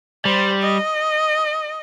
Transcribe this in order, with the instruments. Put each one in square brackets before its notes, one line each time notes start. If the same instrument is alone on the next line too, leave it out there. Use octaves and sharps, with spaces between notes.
[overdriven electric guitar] G3 [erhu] C5
[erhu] D#5